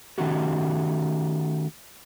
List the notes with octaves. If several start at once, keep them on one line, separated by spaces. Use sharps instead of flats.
D#3 A3 C#4 D#4 F#4 G4